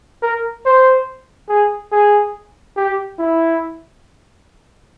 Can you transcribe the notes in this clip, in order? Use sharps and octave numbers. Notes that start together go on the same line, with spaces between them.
A#4
C5
G#4
G#4
G4
E4